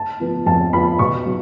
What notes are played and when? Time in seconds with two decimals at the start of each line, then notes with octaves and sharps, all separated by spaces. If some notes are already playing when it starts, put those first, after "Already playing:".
Already playing: A5
0.20 F3 B3 F4
0.46 F2 A5
0.73 F3 B3 F4 B5
0.99 B2 C#6
1.26 F#3